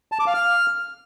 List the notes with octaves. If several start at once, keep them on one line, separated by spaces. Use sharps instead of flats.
A5
D6
F5
F6